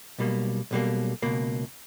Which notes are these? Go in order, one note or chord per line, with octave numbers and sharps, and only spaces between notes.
B1 B2 G3 A#3
B1 B2 G3 A#3
C#2 B2 A#3